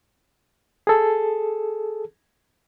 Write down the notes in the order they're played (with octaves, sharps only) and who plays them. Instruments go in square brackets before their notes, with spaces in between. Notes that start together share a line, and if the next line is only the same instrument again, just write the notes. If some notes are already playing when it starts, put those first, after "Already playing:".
[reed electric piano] G#4 A4